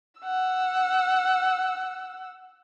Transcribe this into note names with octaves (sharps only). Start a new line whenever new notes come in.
F#5 E6